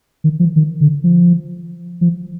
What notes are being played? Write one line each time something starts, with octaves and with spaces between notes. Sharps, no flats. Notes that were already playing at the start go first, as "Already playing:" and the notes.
D#3
F3
D#3
D3
F3
F3